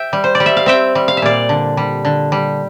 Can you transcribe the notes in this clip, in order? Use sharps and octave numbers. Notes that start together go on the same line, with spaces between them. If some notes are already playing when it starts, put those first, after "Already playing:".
Already playing: E5 G5
G3
C5
D5
G3
E5
F5
C4 E5 G5
G3
F5
E5
A#2 D5 F5
D3
G3
D3
G3